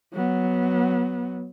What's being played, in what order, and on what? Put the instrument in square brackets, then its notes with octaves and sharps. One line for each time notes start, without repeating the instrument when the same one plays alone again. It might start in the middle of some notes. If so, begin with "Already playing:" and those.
[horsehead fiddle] F#3 B3